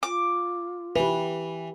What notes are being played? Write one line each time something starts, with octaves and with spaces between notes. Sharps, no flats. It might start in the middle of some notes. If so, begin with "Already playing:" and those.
F4 D6
E3 G4 B4